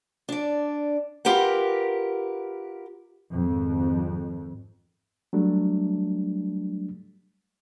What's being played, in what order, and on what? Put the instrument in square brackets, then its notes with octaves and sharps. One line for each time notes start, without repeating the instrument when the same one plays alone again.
[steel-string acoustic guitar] D4 D5
F4 G4 A#4 B4 F#5
[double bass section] G#1 F2
[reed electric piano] F#3 G3 A3 D4